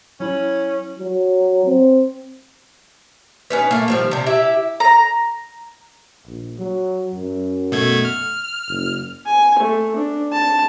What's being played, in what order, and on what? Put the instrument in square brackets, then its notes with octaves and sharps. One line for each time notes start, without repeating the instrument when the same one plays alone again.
[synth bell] F#3 E4 F#7 [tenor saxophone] C#4
[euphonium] F#3
C4
[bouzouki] C#4 D#4 B4
A3 A#3
D#3 F3 G3
C3 D4
E4 G4 E5
[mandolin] A#5
[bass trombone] A#1
F#3
F#2
[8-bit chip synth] B2 A3 G#6
F6
[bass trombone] F#1
[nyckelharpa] G#5
A3
D4
A5